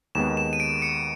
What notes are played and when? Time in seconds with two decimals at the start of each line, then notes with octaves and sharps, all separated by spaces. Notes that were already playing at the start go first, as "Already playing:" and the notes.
0.15 D#2 D#3 G#3 B3 E7
0.37 E7
0.53 D#7
0.60 D7
0.82 C#7